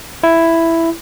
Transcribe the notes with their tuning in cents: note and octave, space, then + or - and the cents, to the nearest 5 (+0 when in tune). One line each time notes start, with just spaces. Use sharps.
E4 +5